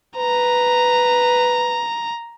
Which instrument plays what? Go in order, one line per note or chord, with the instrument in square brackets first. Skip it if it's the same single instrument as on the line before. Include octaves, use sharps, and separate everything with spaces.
[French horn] B4 [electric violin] A#5